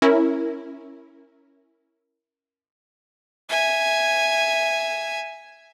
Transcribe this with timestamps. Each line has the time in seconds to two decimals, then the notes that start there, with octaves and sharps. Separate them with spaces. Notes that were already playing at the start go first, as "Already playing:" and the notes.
0.02 C#4 E4 A#4
3.50 E5 G#5